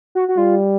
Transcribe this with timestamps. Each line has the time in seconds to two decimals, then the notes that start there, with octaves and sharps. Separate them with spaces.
0.15 F#4
0.28 F#4
0.37 G3 F4